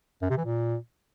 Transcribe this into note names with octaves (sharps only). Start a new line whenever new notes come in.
F#2
C3
E3
A#2